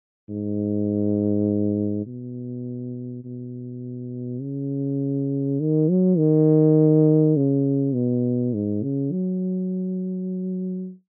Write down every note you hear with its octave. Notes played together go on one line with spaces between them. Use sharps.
G#2
B2
B2
C#3
D#3
F#3
D#3
C#3
B2
G#2
C#3
F#3